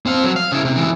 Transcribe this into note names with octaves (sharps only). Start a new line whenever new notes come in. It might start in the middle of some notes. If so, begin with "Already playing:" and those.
C4 F5
F#3
F5
C#3 E4
C3
C#2 E3